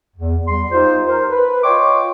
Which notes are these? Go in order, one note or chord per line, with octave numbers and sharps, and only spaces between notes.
E2
E2 G3 C6
D#4 F4 G4 C5
A#4 C5
B4
F4 C#5 D#5 G5 C6 D6